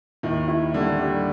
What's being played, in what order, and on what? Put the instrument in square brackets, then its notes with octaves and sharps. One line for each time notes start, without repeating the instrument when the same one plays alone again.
[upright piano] D#2 D#3 [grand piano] E4
[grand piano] E4
[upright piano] D3 [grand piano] G3
[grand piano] G3